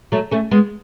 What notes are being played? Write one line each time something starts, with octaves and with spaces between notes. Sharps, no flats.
F#3 A3
A3 C#4
G#3 B3